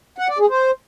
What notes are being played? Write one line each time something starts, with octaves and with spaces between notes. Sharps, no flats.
F#5
D5
G#4
C5